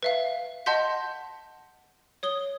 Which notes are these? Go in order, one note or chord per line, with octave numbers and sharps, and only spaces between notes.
B4 E5 F5
D#5 F#5 A5 C6 G6 B6
C#5 D#6 G7